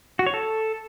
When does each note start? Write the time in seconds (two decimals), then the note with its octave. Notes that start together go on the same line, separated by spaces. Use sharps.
0.19 F#4
0.26 C#5
0.34 A4